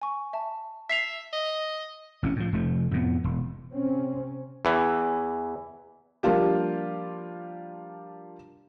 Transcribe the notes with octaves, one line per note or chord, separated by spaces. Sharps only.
G#5 C#6
E5 A5
E5 B6 C7 F7
D#5
A1 C3 C#4
A2 F3
F1 F3 A3
F2 A2 B3
E1
C3 C4 C#4
E2 E3
F3 G3 A#3 D4 F4 G4